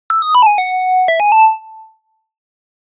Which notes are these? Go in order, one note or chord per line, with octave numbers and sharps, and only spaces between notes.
E6
D#6
B5
A5
G#5
F#5
E5
G#5
A5